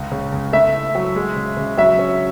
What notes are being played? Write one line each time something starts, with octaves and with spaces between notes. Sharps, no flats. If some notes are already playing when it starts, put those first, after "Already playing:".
Already playing: C#2
C#3
C#2
A3 E5
E4
F#3
G#3
C#3
C#3
F#3 E5
C#4